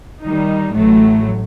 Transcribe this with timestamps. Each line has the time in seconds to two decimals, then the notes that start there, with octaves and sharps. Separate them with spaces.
0.23 D#3 G3 D#4
0.73 A1 A2 F#3 A3